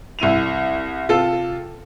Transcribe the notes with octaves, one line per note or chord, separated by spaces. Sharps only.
C2 E4 D#7 F7
C3 F4 A4